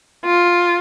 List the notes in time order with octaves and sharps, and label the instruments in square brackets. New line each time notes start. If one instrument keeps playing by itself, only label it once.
[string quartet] F4